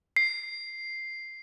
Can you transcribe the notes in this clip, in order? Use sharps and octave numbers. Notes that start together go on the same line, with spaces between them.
C7